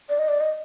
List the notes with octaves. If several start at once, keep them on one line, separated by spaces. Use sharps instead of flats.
D5
D#5
D5
D#5